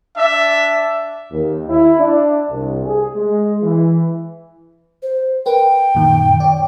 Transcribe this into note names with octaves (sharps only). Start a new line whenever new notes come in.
D4 E5
D#2
E4
D4
C2
G#4
G#3
E3
C5
A#4 B4 G5
F#2 A#2 D#3
C#5 D5